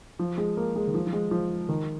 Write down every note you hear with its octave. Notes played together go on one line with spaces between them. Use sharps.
F3
G#3
A#3
G#3
D#3
F3
F3
G#3
F3
D#3